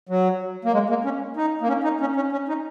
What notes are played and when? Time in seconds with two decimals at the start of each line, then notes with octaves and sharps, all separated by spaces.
0.09 F#3
0.65 A#3
0.73 G#3
0.89 A#3
1.04 C#4
1.37 D#4
1.61 A#3
1.68 C#4
1.84 D#4
2.01 C#4
2.16 C#4
2.32 C#4
2.48 D#4